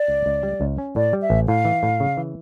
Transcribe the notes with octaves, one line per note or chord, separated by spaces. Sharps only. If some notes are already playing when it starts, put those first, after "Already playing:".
Already playing: D5
C#2
C#2
G3
C#2
C#4
A2 D5
G3
E5
A1
A2 F5
E3
A2
C#3
E3